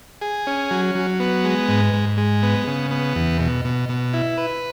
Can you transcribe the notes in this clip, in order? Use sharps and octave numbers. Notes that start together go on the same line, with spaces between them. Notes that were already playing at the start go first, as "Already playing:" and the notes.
G#4
C#4
F#3
F#3
B3
G#3
G#2
G#2
G#3
B3
C#3
B3
E2
B2
B2
B2
E4
B4